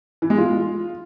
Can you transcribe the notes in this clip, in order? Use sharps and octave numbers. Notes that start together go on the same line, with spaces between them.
E3
G#3
F4